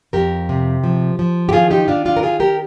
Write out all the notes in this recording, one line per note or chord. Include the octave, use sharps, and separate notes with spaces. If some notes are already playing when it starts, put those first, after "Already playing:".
F2 G4 A#4
C3
F3
F3
G4
D#3 F4 G#4
D#4 G4
D#3 D4 F4
D4 F4
A#4
D#3 F4 G#4
G4 A#4